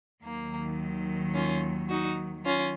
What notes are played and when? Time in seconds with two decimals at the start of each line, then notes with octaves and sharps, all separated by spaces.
0.24 D#2 D#3 F#3 A#3
1.34 C#4 F4
1.89 D#4 F#4
2.45 D#3 F#3 C#4 F4